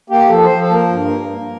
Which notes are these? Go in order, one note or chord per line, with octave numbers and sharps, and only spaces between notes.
A#3 G4
F3 A4
C5
F3
A4
A#3 A#4
G2
A#3
A#3